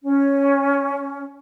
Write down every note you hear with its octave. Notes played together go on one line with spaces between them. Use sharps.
C#4